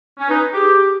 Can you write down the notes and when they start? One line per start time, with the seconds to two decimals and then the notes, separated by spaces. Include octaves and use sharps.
0.19 C#4
0.30 D#4 B4
0.53 G4 G#4
0.77 G4